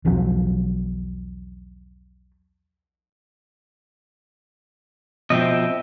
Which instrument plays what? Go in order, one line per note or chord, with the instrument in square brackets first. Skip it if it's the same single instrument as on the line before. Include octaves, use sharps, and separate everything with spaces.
[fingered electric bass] B1 E2 F3 F#3
[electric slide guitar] B2 F3 C4 [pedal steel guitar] D#5 E5 G5